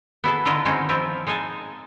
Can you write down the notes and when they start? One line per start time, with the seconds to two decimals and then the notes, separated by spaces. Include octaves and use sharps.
0.24 B3 E4 G#4 A4
0.45 D3 D#3 E4 F4 D#5
0.65 F#3 G#3 C4 C#4 D#4
0.89 F3 C4 E4 F4
1.27 G#3 D#4 D#5 G#5 A5